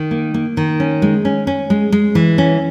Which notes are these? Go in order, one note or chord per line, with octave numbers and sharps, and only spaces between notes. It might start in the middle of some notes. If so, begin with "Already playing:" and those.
Already playing: D#3
A#3
A#3
D#3
C#4
G#3
C#4
C#4
G#3
G#3
E3
C#4